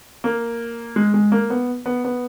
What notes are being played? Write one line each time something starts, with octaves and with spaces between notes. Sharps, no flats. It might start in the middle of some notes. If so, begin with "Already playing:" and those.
A#3
G#3
G#3
A#3
B3
B3
B3